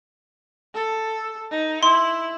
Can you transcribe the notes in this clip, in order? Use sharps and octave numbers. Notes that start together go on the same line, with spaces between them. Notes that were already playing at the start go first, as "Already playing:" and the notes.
A4
D#4
E4 C6